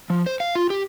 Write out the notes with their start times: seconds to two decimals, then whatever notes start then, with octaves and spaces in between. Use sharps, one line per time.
0.10 F3
0.26 C5
0.40 F5
0.55 F4
0.70 G4